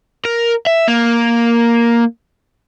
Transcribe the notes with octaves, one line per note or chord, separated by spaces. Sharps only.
A#4
E5
A#3